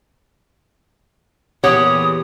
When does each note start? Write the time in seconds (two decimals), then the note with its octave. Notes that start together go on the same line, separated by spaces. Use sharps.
1.64 E2 A#2 G4 C#5 F#5 D#6